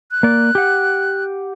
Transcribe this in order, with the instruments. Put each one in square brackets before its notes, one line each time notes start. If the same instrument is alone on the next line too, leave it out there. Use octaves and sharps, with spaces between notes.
[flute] F#6
[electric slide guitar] A#3 D5
G4 F#5